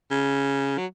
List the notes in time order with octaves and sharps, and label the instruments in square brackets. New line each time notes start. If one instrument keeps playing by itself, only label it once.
[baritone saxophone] C#3
F#3